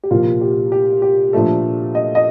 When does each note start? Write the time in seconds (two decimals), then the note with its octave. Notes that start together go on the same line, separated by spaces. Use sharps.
0.03 G4
0.11 C2 A#2 F3 A#3 F4
0.41 G4
0.72 G4
1.02 G4
1.33 A#2 F3 A3 D4 A4
1.95 D#5
2.15 D#5